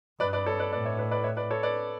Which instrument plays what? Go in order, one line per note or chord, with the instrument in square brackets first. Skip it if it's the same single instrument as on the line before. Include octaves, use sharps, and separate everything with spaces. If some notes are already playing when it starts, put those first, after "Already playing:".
[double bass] G2 [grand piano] B4 D5
[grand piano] B4 D5
A4 C#5
B4 D5
[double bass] A2 [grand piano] B4 D5
[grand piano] C#5 E5
B4 D5
B4 D5
C#5 E5
B4 D5
A4 C#5
B4 D5